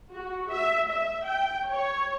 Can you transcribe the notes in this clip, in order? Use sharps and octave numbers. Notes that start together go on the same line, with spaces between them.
F#4
E5
E5
G5
C#5